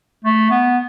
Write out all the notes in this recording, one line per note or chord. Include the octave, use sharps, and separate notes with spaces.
A3
B3